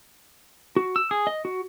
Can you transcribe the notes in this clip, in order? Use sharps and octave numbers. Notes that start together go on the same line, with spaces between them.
F#4
E6
G#4
D#5
F#4